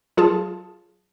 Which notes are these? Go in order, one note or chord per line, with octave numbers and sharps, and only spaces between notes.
F#3 F4 G#4 A5